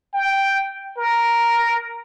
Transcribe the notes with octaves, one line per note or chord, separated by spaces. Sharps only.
G5
A#4